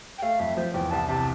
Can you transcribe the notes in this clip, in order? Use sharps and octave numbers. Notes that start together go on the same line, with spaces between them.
G5
A3 F5
F2 E5
F3 C5
E2 G5
C2 A5
C3 A5